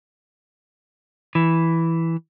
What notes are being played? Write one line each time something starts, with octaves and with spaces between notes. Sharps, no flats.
E3